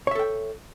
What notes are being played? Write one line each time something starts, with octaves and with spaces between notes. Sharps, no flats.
A4 C#5 E5 G5